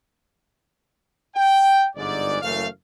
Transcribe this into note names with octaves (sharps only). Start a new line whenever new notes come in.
G5
G1 G#2 D5
F#1 F#2 E3 A3 F5